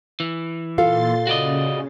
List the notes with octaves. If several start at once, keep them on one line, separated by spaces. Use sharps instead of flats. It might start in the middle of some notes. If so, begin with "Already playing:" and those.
E3
A#2 F4 A4 F5 C6 A6
C#3 F#4 D5 D#5